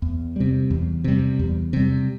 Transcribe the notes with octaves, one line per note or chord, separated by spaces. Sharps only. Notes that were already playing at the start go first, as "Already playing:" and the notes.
E2
C3 G3
E2
C3 G3
E2
C3 G3